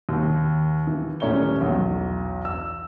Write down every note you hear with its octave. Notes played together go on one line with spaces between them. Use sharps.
D#2
E3
D#1 A2 C#4 C#5 A#5 G7
B1 E2
E6